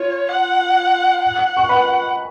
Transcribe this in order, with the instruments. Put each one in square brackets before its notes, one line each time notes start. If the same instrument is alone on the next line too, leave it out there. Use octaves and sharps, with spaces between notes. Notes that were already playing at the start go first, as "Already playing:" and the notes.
Already playing: [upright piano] F4 [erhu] C#5
[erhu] F#5
F#5
[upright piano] C#6
B4 B5